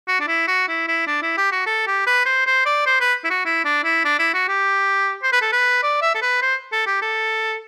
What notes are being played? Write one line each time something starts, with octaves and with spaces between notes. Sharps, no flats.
F#4
D4
E4
F#4
E4
E4
D4
E4
G4
F#4
A4
G4
B4
C5
C5
D5
C5
B4
E4
F#4
E4
D4
E4
D4
E4
F#4
G4
C5
B4
A4
B4
D5
E5
A4
B4
C5
A4
G4
A4